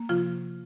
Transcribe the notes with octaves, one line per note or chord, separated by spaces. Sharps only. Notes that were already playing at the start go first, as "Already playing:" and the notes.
Already playing: A#3
C3 F3 F4